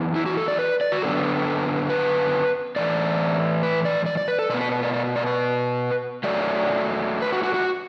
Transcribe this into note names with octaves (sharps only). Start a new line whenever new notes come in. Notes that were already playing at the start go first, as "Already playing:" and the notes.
Already playing: F#2 E3 B3
E4
F#4
A4
D5
B4
D5
F#4
F#2 D3 B3 A4
B4
A2 E3 A3 D5
B4
D5
D5
D5
B4
A4
B2 B3 D5
B4
B4
D5
D5
D5
B4
F#2 F#3 A3 D5
B4
F#4
F#4
F#4